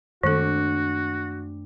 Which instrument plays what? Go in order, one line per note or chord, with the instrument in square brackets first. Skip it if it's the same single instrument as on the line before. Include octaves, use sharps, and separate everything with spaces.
[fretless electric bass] F#2 G#3 A3 [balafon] D#3 A4 [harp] C4 D4 [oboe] F#4